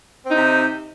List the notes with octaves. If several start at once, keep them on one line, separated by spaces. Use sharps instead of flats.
C3 C4 D#4